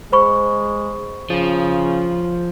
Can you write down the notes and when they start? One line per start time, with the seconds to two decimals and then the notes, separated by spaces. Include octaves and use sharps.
0.12 G#3 C5 B5 C#6
1.30 C#3 F3